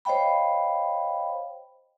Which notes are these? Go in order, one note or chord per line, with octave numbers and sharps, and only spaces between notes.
C5 C#5 D#5 F5 G5 B5